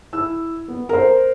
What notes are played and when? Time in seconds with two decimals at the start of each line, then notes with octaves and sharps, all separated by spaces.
0.13 E4 E6
0.68 B3
0.89 A#4 C5